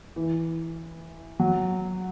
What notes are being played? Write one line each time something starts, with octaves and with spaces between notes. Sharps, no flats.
E3
F#3